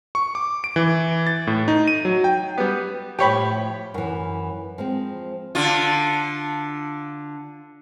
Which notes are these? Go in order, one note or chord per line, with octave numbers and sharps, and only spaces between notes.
C#6
D6
D7
E3
A6
A2
D#4
D#7
F#3
G5
G3 B3
A2 F3 G4 C#5 B5
F#2 E3
F3 G#3 C4
D3 F4